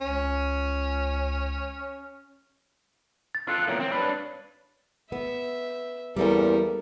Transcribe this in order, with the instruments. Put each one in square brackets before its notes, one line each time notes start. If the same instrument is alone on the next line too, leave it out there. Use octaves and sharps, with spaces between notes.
[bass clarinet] C#2 [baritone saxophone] C#4
[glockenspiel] A6
[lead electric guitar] F4 A4 [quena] F#6
[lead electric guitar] E2 A#2 [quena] C#5
[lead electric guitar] C4
D4 B4
[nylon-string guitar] B3 [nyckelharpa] E5
[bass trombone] E2 [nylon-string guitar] G3 A#3 C#4 [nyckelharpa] A4 A#4